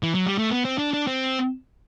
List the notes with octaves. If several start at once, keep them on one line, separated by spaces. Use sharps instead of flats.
E3
F#3
G3
A3
B3
C4
D4
D4
C4